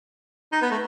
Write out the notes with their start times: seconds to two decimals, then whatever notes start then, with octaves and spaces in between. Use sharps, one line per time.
0.52 D#4
0.62 B3
0.71 A3